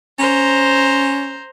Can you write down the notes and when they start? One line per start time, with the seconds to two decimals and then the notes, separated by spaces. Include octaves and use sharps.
0.19 C#4 C5 A#5